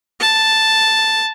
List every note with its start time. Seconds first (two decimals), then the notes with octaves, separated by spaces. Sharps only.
0.20 A5